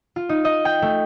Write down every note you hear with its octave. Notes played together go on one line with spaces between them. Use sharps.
F4
D#4
D#5
G5
A3